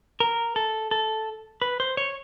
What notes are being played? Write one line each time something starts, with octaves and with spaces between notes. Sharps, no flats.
A#4
A4
A4
B4
C5
C#5